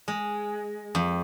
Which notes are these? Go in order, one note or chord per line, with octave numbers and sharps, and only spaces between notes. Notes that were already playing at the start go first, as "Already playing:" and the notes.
G#3
F2